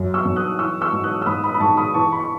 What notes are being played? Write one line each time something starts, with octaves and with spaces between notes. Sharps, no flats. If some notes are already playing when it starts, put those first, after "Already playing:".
Already playing: F#2
C#6 E6
F#2
D#6 F#6
E3 C#6 E6
C#6 E6
G#2
D#6 F#6
E6
G#2 B5 D#6
B5 D#6
B5
G#2 A5 C#6
B5 D#6
E3 A5 C#6
B5
C#6